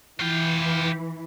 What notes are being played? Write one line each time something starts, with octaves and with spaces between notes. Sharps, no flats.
E3 F4 G4